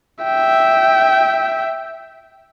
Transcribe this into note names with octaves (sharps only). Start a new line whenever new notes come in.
E5 G5